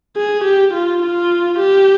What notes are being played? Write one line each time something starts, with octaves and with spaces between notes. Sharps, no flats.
G#4
G4
F4
F4
G4